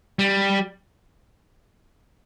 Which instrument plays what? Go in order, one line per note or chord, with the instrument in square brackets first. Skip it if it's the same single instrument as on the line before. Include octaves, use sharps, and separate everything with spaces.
[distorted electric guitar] G3